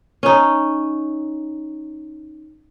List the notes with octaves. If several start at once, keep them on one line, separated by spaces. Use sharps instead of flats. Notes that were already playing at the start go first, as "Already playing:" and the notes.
C#4 D#4